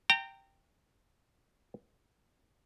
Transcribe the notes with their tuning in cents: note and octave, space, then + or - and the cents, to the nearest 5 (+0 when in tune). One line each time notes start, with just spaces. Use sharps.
G5 +0 A#5 -30